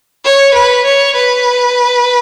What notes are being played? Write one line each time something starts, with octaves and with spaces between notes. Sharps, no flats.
C#5
B4
C#5
B4